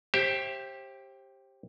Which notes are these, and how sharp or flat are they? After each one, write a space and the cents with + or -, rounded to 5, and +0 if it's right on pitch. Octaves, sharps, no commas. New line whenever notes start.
G4 +0 C5 +30 E5 +20